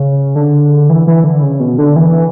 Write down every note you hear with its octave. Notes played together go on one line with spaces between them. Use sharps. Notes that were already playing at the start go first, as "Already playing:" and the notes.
Already playing: C#3
D3
E3
E3
D3
C#3
B2
D3
E3